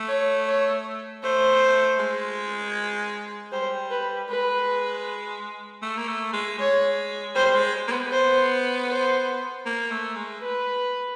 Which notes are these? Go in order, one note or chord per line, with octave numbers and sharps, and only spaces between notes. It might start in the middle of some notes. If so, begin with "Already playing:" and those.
Already playing: A3
C#5
C#5
A3 C5
G#3
G3 C5
B4
G#3 B4
A3
A#3
A3
G#3
G#3 C#5
G3 C5
G#3
A#3
B3
C5
C5
A#3
A3
G#3
B4